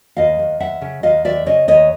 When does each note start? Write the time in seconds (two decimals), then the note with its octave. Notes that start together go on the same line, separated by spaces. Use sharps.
0.17 D#2 D#5 F5
0.39 D#2
0.60 D#2 E5 F#5
0.82 C#3
1.03 D#2 D#5 F5
1.25 D#2 D5 E5
1.46 C#3 C#5 D#5
1.68 D#2 C#5 D#5